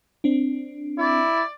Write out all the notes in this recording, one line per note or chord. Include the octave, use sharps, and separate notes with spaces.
C4 D4
E4 D5